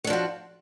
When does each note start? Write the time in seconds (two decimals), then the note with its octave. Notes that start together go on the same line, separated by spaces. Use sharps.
0.04 F#3
0.07 D4
0.10 F3
0.13 F#4